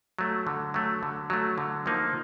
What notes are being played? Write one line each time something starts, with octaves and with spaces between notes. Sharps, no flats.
F#3 A3
D3
F#3 A3
D3
F#3 A3
D3
F3 A#3 D#4